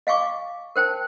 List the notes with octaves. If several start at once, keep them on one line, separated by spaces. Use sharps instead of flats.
D#5 F5 G#5 C#6 D6
A#4 C5 G5 A5